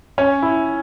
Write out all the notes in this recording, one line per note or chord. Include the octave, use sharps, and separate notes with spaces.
C#4
E4